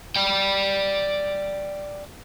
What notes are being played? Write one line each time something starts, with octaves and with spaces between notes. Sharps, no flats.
D5 G5